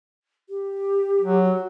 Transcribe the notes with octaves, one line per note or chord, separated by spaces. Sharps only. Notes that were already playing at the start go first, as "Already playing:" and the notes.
G4
F#3
F#4